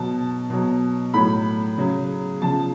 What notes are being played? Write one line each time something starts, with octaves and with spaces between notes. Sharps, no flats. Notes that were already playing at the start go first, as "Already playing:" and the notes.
Already playing: B2 F#3 A5
B2 F#3
A2 F#3 B5
C#3 F#3
C#3 F3 A5